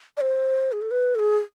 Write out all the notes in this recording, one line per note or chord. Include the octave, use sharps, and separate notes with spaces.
D5
C5
G#4
A4
B4
A4
G#4